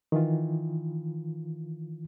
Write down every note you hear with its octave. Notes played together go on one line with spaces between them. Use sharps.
D#3 E3 F4